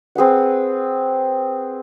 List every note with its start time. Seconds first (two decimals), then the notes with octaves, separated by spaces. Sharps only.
0.15 C4 G#4 B4 F#5